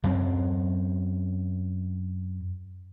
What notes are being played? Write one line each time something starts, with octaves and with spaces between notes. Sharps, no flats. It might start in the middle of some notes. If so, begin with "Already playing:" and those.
F#2 F#3 C4